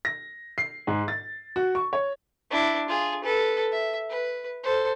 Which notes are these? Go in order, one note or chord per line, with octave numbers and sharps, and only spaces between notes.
A#6
C7
G#2
A6
F#4
C#6
C#5
D4 E4
F4 G#4
A4 B4
E5
B4
A4 C5